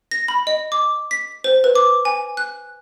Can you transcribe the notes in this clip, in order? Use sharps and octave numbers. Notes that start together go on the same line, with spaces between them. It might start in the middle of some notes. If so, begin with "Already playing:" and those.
A#6
B5
D#5
D6
B6
C5
B4
D6
G#5
F#6